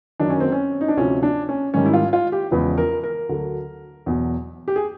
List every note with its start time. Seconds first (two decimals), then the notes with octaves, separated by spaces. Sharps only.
0.20 F#2 D#3 F#3 D4
0.30 C#4
0.40 C4
0.52 C#4
0.81 D#4
0.88 D4
0.97 D2 C3 F3 C#4
1.23 D4
1.49 C#4
1.74 G#2 D#3 G3 C#4
1.86 E4
1.94 F4
2.13 F4
2.32 G4
2.51 E2 C#3 F3 G#3 B4
2.78 A#4
3.03 A#4
3.29 D2 D3 F#3
4.06 E2 B2 F#3
4.68 G4
4.76 G#4